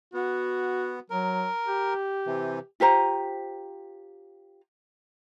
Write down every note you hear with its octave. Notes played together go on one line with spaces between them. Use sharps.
B3 F#4
F#3 A#4
G4
C3 E3
F4 G4 C5 A#5